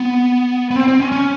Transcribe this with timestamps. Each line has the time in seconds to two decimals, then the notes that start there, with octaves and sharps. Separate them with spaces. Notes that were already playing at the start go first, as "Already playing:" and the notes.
Already playing: B3
0.71 B3
0.75 C4
0.88 C4
1.00 C#4
1.12 C#4